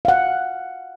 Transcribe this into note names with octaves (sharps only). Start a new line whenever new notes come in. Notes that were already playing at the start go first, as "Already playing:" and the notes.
F5 F#5